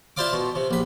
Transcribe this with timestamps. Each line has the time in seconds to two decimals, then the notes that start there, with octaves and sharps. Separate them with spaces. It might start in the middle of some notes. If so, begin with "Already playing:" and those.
0.17 E4 F4 C5 D5 F5 D6
0.33 B2
0.55 C3
0.71 A#1 B4